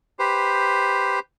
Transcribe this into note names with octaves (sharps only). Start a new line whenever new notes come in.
G4 B4 C5